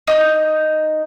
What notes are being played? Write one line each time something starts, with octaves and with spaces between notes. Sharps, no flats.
D#4 D#6 G6